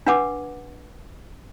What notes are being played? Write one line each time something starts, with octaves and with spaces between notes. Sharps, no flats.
D4 B4 F#5 D6